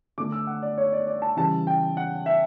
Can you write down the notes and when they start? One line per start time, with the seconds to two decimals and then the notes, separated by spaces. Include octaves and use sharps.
0.18 D3 A3 D6
0.32 E6
0.47 F#5
0.63 D5
0.78 C#5
0.93 D5
1.07 D5
1.22 A5
1.37 C#3 E3 G3 A5
1.67 G5
1.97 F#5
2.26 E5